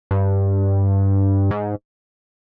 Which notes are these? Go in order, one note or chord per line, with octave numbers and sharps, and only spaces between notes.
G2
G#2